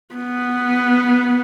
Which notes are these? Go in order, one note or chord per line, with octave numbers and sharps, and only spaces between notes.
B3